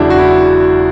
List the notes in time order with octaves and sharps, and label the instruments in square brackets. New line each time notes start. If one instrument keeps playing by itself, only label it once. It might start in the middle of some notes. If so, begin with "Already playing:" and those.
Already playing: [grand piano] E1 E2 C#3 F#3 D4 E4
F#4
E4